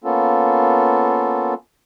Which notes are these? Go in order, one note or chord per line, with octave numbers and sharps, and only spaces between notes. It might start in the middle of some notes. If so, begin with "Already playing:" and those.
A#3 B3 C#4 F4 A4